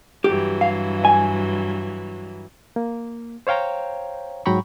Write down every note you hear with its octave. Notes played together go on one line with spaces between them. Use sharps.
G2 E3 F#3 G4
F5
G#5
A#3
C5 C#5 F5 G5 A#5
G#2 F#3 G5 A#5 B5 C#6